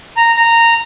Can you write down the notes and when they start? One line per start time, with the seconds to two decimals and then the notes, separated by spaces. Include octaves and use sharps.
0.17 A#5
0.37 A#5